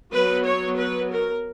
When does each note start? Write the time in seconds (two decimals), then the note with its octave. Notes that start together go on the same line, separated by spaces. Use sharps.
0.13 F#3 B3 B4
0.46 C#5
0.78 B4
1.10 A#4